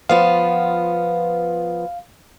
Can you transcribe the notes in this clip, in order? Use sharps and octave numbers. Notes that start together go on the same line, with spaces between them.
F3 B3 F4 F5